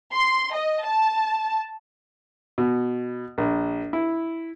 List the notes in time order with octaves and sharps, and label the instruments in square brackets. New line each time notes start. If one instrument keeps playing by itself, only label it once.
[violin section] C6
D#5
A5
[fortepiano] B2
A#1
E4